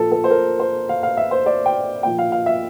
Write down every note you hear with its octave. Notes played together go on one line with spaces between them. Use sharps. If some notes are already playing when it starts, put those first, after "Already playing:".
Already playing: A#2 F3 A4
A4
C5
A#4
C5
F5
F5
E5
C5
D5
G5
A#2 F3 G5
F5
F5
E5